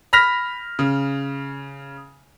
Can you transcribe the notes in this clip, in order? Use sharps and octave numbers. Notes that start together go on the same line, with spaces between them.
B5 F6 A#6 B6 F7
C#3